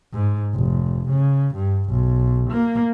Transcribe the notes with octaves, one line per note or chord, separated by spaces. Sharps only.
G#2
F1
C#3
G2
B1
A#3